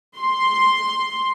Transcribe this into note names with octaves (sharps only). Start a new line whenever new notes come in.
C6